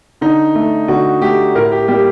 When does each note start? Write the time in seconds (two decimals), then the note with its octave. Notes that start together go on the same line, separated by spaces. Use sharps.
0.21 D3 D#4
0.55 A3
0.88 D3 F#4
1.21 A3 G4
1.55 A2 A#4
1.72 G4
1.88 G3 A#3 G4